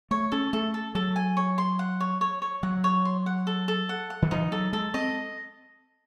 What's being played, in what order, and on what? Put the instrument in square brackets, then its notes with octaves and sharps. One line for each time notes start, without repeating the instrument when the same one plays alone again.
[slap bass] A3 [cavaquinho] C#5
[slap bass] C#4 [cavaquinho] A4
[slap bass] A3 [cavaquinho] A4
[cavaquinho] A4
[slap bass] F#3 [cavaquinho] A4
[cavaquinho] G#5
C#5
C6
F#5
C#5
C#5
C#5
[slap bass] F#3 [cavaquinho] F#5
[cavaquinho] C#5
C6
F#5
A4
A4
F#5
F#5
[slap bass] D#3
[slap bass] E3 [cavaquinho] D#4
[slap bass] F#3 [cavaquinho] A4
[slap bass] G#3 [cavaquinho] A4
[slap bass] C4 [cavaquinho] D#5